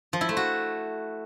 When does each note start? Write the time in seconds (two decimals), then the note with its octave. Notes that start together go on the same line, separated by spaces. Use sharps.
0.13 F3
0.21 E4
0.29 A3
0.37 F#4